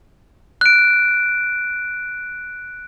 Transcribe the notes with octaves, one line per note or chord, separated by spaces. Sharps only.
F#6 D7